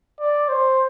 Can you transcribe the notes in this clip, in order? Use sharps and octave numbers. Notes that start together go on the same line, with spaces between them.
D5
C5